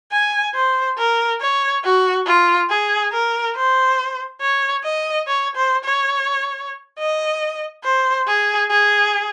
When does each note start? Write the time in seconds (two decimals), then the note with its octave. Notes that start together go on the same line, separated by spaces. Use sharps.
0.12 G#5
0.54 C5
0.98 A#4
1.40 C#5
1.84 F#4
2.26 F4
2.70 G#4
3.13 A#4
3.56 C5
4.41 C#5
4.84 D#5
5.27 C#5
5.55 C5
5.84 C#5
6.99 D#5
7.84 C5
8.27 G#4
8.70 G#4